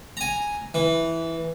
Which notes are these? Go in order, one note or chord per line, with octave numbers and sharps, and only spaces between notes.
G#5 A#5
E3